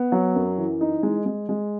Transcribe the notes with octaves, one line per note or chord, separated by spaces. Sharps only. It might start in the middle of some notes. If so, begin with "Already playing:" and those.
Already playing: B3
F#3
F#2
E3
D#4
G#3
G#3
G#3